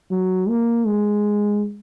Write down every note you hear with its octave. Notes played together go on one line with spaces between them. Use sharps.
F#3
A#3
G#3